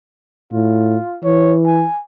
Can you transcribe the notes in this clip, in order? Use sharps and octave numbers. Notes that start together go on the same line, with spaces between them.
A2 F4
E3 C#5
G#5